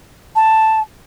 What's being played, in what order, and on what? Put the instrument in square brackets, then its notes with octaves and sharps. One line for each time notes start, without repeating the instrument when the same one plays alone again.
[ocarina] A5